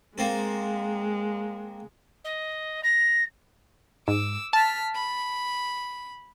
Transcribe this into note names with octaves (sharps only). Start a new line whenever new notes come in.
G#3 A#3 C4 A4
D#5
A#6
G#2 D6 E6
A5 F6 B6
B5